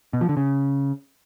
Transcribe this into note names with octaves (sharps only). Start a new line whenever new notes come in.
B2
F3
D3
C#3